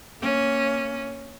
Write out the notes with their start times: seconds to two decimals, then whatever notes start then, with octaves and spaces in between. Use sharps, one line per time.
0.21 A#3 C#4